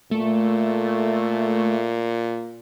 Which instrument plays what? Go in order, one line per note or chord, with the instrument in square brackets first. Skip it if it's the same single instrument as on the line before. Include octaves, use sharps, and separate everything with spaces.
[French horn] A#2 [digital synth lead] A3